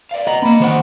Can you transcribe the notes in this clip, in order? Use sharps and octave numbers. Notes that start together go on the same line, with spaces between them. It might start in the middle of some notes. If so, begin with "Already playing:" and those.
D5 F5
B4 D#5 A#5
A#3 C4 D#5 B5
D#3 C5 F#5